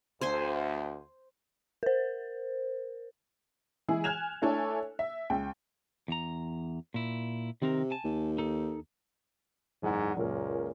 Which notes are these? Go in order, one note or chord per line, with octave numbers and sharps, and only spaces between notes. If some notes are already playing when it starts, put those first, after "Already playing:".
D2 C5 G#5 C6
A#4 C5
E3 G#3 E4 G#4
G#5 F6 F#6 G#6 E7 F7
A3 D4 E4 A4 C#5 G#5
E5
C#2 G5
E2 A#5
A#2 E4
C3 D#3 C4 A#4
G#5 A5
D#2
D#4 A4
F#1 E2 G#2 F#5
C#2 F#2 A#2 A#4